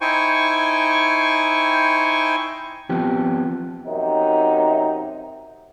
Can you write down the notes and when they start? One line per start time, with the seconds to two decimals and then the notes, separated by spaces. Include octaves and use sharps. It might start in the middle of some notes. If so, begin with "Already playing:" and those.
0.01 D#4 E4 C5 G5 G#5 C#6
2.89 F3 B3 C4 G4
3.86 F#2 C3 D#4